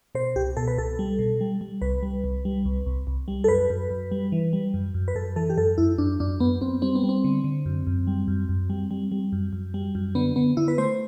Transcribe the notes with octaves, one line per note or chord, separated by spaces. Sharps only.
B2 C5
C2 G4
B2 A4
B4
C2 A4
G3
B2
G3
G3
C2 B4
G3
C2
G3
C2
C2
C2
G3
A4
F#2 B4
F#2
F#2
G3
E3
G3
F#2
F#2
B4
F#2 A4
E3 A4
G4
F#2 A4
F#2 E4
F#2 D4
F#2 D4
F#2 B3
F#2 C4
G3 C4
B3
G3
C4
D3
D3
F#2
F#2
G3
F#2
F#2
G3
G3
G3
F#2
F#2
G3
F#2
D3 B3
D3 B3
D3 E4
B4
A3 C5